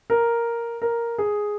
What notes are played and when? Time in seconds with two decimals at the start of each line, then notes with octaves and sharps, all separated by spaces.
0.10 A#4
0.82 A#4
1.18 G#4